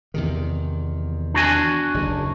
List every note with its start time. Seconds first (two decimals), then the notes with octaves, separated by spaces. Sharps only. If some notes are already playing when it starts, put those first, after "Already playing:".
0.14 E2 C3 D#3
1.34 D4 F#4 G#5
1.94 F#1 D#2